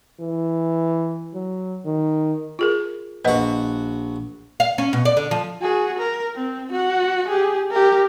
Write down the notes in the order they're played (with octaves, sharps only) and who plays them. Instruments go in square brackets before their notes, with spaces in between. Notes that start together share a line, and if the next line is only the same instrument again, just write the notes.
[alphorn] E3
F#3
D#3
[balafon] F4 G#4 A#4
[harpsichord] A#1 F#4 [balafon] B4 D#5 F#5
[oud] F5
C#4
B2
D5
D3
F3
[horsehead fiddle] F#4 G#4
A#4
C4
F#4 F#5
G4 G#4
G4 A#4